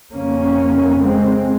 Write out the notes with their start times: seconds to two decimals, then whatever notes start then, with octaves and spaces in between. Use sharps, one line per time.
0.13 F2 C#3 A#3 C#4
1.00 G#3 C4